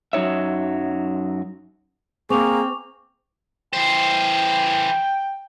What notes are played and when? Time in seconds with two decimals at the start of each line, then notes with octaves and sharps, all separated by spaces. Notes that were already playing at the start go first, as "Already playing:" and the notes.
0.13 F#2 F#3 D#4 C#5 E5
2.30 A#3 C4 G#4 C#6 D6 F7
3.73 E3 C5 G5